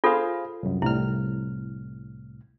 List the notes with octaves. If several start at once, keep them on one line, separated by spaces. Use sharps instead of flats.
F4 G#4 A4 C5 F5
C2 F#2
C2 A2 E4 F6